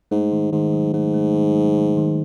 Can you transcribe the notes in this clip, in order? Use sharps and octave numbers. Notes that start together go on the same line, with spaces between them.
G#2 A3
D#3
G#2 D#3
F#3
G#2 A3
A3
D#3
F#3
D#3
D#3